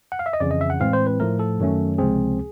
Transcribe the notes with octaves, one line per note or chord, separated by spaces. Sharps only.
F#5
F5
E5
D#5
F2 C#3 E3 D5
D#5
E5
F#5
A2 E3 G#3 C4 F5
C5
B4
A2 F3 A3 A#4
A4
F#2 D#3 F#3 A3 C#4
C#2 C3 F3 G#3 C4 G#4